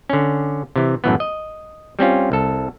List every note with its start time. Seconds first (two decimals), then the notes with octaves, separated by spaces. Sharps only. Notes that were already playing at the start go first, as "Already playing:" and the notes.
0.10 D3 C#4
0.76 C3 E3
1.04 F#2 A2 E3 B3
1.20 D#5
1.99 G3 C4 C#4 F4
2.32 C2 A4